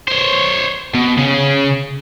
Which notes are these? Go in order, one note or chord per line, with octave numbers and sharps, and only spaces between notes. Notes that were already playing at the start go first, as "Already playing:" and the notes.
C5 C#5
B2
C#3 C#4